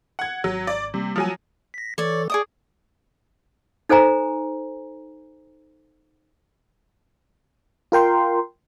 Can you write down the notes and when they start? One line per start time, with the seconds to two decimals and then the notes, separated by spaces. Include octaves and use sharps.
0.19 F#5 G#6
0.44 G#1 F#3
0.67 D5
0.94 C3 G3 A#3
1.16 F3 F#3 G#5
1.74 A#6 B6
1.98 E3 A4 C#5 D5
2.30 G#4 D5 D#6
3.89 D#4 A4 C5 G#5 A#5
7.92 F4 A#4 G5 C6